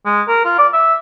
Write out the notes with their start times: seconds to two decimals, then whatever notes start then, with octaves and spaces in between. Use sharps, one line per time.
0.06 G#3
0.28 A#4
0.45 F4
0.58 D5
0.73 E5